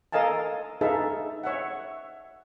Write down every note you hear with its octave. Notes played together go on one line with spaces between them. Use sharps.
A4 A#4 D#5 F5 G#5 A5
D#4 G#4 A4 B4 E5 F5
C#5 E5 F#5